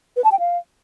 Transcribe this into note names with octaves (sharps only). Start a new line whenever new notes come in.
B4
A5
G5
F5